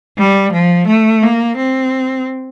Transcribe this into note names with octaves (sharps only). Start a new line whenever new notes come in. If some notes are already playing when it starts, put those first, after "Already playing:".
G3
F3
A3
A#3
C4